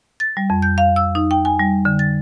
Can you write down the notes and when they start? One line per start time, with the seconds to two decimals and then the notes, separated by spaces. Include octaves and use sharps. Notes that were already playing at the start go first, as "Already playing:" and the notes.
0.20 A6
0.37 G3
0.50 F2
0.62 G6
0.78 F5
0.96 E6
1.15 D#4
1.31 G5
1.45 G#5
1.59 G3
1.85 D3
1.99 A6